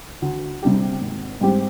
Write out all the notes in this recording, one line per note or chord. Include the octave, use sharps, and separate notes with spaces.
D2
C3 G3 D4 G4
G#1
G#2 G3 C4 G4